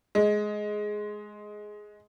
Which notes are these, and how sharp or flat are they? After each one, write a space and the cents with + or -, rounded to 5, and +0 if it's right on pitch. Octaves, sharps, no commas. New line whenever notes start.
G#3 +10